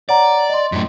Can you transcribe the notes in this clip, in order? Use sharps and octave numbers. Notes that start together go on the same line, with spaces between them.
C#5 D5 F#5 A#5
D#5 C6
F#2 A2